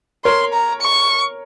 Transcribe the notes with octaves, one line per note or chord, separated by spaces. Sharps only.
A#4 C#5 C6
A#5
C#6